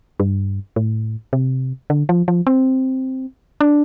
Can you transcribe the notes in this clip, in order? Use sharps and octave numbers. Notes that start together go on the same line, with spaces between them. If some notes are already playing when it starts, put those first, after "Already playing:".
G2
A2
C3
D3
F3
F3
C4
D4